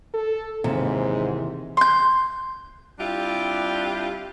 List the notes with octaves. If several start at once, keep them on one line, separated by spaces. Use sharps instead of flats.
A4
D#2 G#2 C3 E3
C6 G6
G3 C4 D4 E4 F4 G4